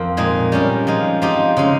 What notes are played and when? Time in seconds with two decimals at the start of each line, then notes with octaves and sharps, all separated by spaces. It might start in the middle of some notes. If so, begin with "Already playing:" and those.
Already playing: F2 A#3 C4
0.17 A#2 G#3 D#4 G#4
0.52 G3 C#4 G4 A#4
0.87 F3 G#3 D#4
1.22 F3 C4 D#4 G4
1.57 C#3 G#3 D#4